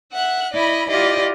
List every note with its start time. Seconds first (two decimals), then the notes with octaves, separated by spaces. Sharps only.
0.14 E5 F#5 F#6
0.54 E4 D5 D#5 B5
0.88 E4 F4 G4 D5 D#5